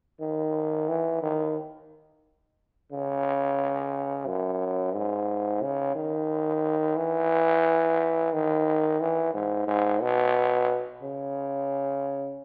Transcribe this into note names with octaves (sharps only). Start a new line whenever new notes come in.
D#3
E3
D#3
C#3
F#2
G#2
C#3
D#3
E3
D#3
E3
G#2
G#2
B2
C#3